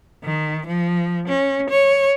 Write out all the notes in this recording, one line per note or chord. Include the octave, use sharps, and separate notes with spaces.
D#3
F3
C#4
C#5